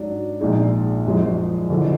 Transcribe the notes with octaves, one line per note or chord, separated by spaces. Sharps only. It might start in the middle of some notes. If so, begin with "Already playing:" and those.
Already playing: G#2 F#3 D4
A#1 A#2 G#3 D#4 G#4
F#1 F#2 F3 G#3
F#1 F#2 D3 F3